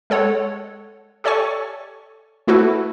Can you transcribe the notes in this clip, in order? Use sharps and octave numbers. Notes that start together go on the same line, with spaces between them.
G#3 A4 C#5 F#5
G4 A4 C#5 D5 G#5 C#6
A3 E4 F#4 A4 B4